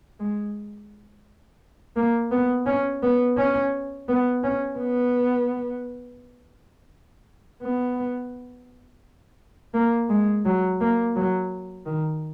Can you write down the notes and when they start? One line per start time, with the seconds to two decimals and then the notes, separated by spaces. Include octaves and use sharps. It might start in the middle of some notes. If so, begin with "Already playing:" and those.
0.20 G#3
1.96 A#3
2.31 B3
2.66 C#4
3.03 B3
3.37 C#4
4.09 B3
4.44 C#4
4.79 B3
7.62 B3
9.74 A#3
10.09 G#3
10.45 F#3
10.80 A#3
11.16 F#3
11.86 D#3